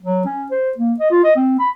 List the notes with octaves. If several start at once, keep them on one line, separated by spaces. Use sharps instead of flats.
F#3
C#4
C5
A#3
D#5
F4
D#5
C4
B5